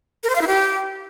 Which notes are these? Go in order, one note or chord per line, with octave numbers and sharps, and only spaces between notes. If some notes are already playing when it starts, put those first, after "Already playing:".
A#4
C5
F5
E4
G4